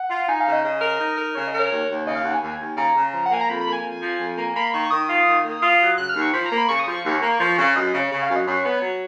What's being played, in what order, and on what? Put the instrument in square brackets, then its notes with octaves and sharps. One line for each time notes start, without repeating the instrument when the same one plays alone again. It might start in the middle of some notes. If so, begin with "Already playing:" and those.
Already playing: [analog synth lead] F#5
[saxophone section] F4
[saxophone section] D#4 [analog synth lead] G#5
[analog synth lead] F5
[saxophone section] C#3
[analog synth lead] D#5
[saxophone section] C#3 [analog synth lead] D#5
[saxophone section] A#4
D#4
A#4
[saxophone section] C#3 [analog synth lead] C#5
[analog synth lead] D#5
[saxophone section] A#4
[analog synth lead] C#5
[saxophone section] D#2 [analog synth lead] C#5
[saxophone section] D#2
[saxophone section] C#3 [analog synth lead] D#5
[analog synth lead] F5
[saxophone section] D#2 [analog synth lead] F#5
[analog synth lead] G#5
[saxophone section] D#2
D#2
[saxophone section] C#3 [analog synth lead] A#5
[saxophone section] C#3
F3
[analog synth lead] F#5
[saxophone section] A#3 [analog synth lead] G#5
[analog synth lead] A#5
[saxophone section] F2 [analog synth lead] B5
[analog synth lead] B5
[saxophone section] A#3
[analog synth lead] G#5
[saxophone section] F2
F3
F2
A#3
[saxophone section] A#3 [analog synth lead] B5
[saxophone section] D#3 [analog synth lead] C#6
[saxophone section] D#3 [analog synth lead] D#6
[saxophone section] F4
D#3
A#3
F4
F#3
[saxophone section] C#3 [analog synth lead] F#6
[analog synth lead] F6
[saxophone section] D#2
[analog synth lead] C#6
[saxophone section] F3 [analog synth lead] B5
[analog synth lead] A#5
[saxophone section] A#3
[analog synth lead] B5
[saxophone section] C#3 [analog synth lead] C#6
[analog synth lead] D#6
[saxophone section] F3 [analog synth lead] C#6
[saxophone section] D#2
A#3
F3
C#3
[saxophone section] F#2 [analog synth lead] D#5
[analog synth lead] D#5
[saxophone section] C#3
[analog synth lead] C#5
[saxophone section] C#3
[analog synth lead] F5
[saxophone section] F#2
[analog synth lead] D#5
[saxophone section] F#2 [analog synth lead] C#5
[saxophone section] B3
F#3